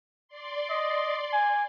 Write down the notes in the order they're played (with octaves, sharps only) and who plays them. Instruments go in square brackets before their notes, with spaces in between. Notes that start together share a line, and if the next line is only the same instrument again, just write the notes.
[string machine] D5 C6
[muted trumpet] D#5
G#5